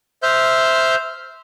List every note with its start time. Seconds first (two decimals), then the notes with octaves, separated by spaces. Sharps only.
0.23 C5 E5 F6 G6